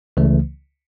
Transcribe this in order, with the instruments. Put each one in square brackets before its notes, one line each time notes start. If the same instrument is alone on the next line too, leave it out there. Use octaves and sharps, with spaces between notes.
[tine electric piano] C#2 C#3 E3 A3